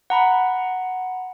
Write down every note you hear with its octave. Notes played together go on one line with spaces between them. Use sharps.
F#5 A#5 B5